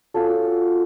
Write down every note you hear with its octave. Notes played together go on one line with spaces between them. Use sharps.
F#3 C#4 F4 A4